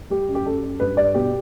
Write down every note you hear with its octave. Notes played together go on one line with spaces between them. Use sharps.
G3 G4
F#2
G4
F#2 A4
F#2
G2 B4
G2 D5
B2 G4